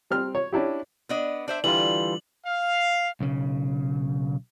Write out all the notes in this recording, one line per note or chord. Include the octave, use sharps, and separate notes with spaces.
G3 C4 F6
C#5
C#4 D4 E4 G4
B3 D4 D#5
D4 C5 E5
D3 E3 G3 F4 F#7
F5
B1 C#3